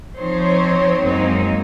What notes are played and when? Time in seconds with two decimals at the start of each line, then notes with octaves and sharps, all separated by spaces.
0.17 F3 C4 D#4 C5 C#5
1.02 F#2 F#3 G#3 A#3 C4 D#4